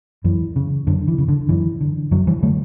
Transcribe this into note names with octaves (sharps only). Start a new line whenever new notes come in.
F#2 E3
C#3
F#2 D3
E3
C#3
D3
F#2 E3
D3
F#2 D3 F#3
E3 G3
D3 F#3 A3